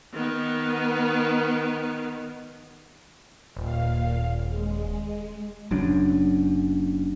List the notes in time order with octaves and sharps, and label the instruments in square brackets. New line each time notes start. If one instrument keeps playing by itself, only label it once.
[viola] D#3 B3
[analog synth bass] D#1 [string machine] A#2 F5
[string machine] G#3
[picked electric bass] F#1 F#2 D4